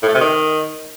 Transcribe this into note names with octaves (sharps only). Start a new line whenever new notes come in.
A2
A3
C3
D#3